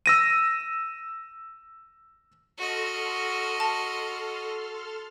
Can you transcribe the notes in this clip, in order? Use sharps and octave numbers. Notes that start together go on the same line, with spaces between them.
E6 A#6 D#7
F#4 A4 D#5 C6 F6
A5